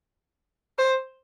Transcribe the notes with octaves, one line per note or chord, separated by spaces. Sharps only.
C5